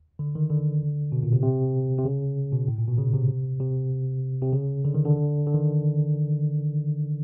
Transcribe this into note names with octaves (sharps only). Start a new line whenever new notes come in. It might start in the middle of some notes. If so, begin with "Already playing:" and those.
D3
D#3
D3
B2
A#2
C3
C3
C3
C#3
B2
A2
A#2
B2
C#3
C3
C3
C3
C#3
D3
D#3
D3
D3
D#3